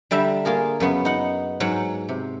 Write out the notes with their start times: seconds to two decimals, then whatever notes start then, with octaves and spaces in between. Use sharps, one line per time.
0.11 D3 G3 E5 A5 A#5
0.45 A#3 F4 G#4 A#4
0.80 F#2 C#3 B3
1.05 D#4 F#5
1.60 G#2 F#3 F#5
2.09 C3